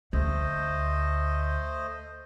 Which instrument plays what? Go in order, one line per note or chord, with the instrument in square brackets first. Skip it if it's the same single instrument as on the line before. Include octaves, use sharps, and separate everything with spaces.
[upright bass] D2 [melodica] A3 C5 D#5